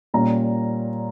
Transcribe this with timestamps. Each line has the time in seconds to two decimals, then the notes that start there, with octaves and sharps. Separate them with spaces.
0.14 A#2 G3 C#4 A#5